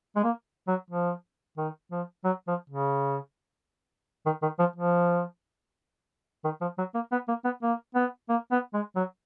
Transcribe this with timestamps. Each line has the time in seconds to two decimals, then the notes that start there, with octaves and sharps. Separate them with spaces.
0.16 G#3
0.24 A#3
0.68 F#3
0.90 F3
1.58 D#3
1.91 F3
2.24 F#3
2.47 F3
2.70 C#3
4.26 D#3
4.42 D#3
4.59 F3
4.76 F3
6.44 D#3
6.61 F3
6.78 F#3
6.94 A#3
7.12 B3
7.28 A#3
7.44 B3
7.62 A#3
7.95 B3
8.29 A#3
8.51 B3
8.73 G#3
8.96 F#3